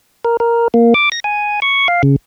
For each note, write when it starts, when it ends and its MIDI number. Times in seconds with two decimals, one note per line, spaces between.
0.25 0.37 70
0.40 0.68 70
0.74 0.94 58
0.94 1.09 86
1.12 1.20 94
1.24 1.60 80
1.62 1.88 85
1.88 2.02 77
2.03 2.16 49